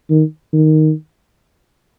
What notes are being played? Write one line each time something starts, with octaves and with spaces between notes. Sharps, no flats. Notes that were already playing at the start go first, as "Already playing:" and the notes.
D#3
D#3